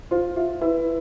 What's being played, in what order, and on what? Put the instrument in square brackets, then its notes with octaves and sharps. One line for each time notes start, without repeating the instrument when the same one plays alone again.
[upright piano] F4 [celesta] C5
[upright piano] F4 [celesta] E5
[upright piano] E4 [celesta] B4